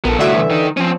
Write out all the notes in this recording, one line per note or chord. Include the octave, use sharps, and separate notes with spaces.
A#1 B3 A4 A#4
C2 A2 D3 F#4 E5
E3
D#3 D#4
F3 C4 C#4